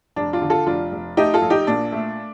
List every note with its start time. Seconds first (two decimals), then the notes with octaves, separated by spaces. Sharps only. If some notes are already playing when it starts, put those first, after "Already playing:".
0.16 F1 D4
0.33 D4 F4
0.42 D3
0.50 F4 A4
0.66 F1 D4 F4
0.92 F1
1.17 A3 D#4 G4
1.34 F4 A4
1.42 A#1
1.50 D#4 G4
1.67 A#2 D4
1.92 A3